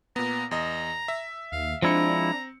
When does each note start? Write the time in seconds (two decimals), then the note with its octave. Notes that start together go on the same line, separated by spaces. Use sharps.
0.16 A#2 B3 A#5
0.51 E2 D#5 A#5
1.08 E5
1.52 D#2 F5
1.82 F3 G#3 C4 D4 E4 A#5 C#7